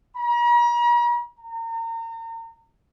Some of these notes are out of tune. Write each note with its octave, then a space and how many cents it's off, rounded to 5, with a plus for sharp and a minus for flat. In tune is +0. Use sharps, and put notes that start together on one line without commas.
A#5 +45
A#5 -35